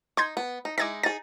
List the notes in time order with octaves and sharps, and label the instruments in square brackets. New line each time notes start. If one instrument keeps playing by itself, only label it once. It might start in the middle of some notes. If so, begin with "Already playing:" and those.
[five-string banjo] D#4 [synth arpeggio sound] C6 G6 G#6
[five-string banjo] B3
D#4
[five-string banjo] G#3 D#4 E4 [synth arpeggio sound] D6 G#6 A#6
[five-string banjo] D#4 G#4 [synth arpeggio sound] A6